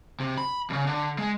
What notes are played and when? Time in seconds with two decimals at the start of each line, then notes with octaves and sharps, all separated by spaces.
0.20 C3
0.37 B5
0.70 D#2 C#3
0.87 D3
1.18 G#3